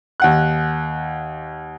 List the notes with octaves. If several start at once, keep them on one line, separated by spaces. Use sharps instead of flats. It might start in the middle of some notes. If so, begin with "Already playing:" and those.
D#2 F#5 F#6